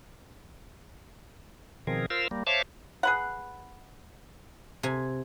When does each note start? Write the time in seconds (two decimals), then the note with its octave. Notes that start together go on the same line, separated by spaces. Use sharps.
1.87 B2 D#3 F3 C4 G#4 A#4
2.10 F4 A#4 C5 F5 E6
2.31 G3 A#3
2.47 C5 C#5 E5 F5 A5 D6
3.03 G#4 B4 F#5
4.83 C3 G#5